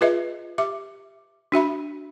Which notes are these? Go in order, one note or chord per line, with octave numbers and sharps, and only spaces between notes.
F4 G#4 B4 D#5 E5
G4 E5 D6
D4 F#4 E5 B5